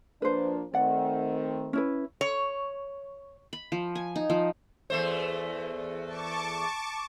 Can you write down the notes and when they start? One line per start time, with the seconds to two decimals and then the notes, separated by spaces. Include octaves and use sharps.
0.22 F3 A#3 D4 B4 C5
0.74 D#3 A3 C4 D5 F#5
1.73 C#4 E4 B4
2.21 C#5
3.53 B5
3.72 F3
3.95 G#5
4.16 D#4
4.30 F3
4.90 E2 A3 C5
6.07 A5 C#6 D6